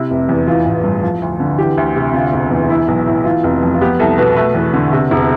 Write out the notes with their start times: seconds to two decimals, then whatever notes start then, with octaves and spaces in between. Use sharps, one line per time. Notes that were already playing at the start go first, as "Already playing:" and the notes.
Already playing: C3 E4
0.11 F1
0.29 E2
0.47 E3 F4
0.65 A1
0.84 G2
1.03 F3
1.22 D2
1.40 D3
1.58 E3 G4
1.77 D2
1.96 C3
2.13 D3 F4
2.33 E1
2.51 E2
2.70 E3 E4
2.88 B1
3.07 A2
3.25 E3 F4
3.43 F1
3.63 F2
3.74 F4
3.81 B3 G4
3.99 C2 A4
4.18 B2 B4
4.36 A3 B4
4.55 E2
4.74 D3
4.93 C3
5.11 E1